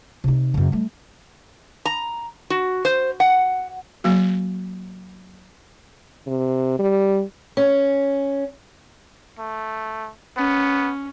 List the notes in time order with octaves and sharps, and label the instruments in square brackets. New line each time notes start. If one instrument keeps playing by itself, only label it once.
[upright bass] C3 D#4
F#2 C#3
G3 A3
[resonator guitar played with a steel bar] A#5
F#4
C5
F#5
[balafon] F#3 A#3 F#4
[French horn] C3
G3
[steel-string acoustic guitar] C#4
[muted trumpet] A3
[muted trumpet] B3 [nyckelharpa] C#4